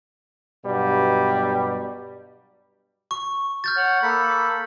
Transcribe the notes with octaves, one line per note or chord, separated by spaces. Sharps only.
G2 B2 F#3 G3
C#6
F6 G6 A6
C#5 F#5
A#3 A4 B5